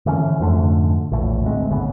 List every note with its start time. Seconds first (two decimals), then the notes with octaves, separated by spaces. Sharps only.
0.06 D3 E3 G3 C#4
0.40 F2 G#2 D3 A3
1.12 A#1 E2 A2
1.45 D2 G#3 C4
1.70 G#1 D2 C#3 B3